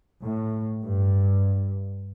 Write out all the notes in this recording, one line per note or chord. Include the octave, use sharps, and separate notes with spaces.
A2
G2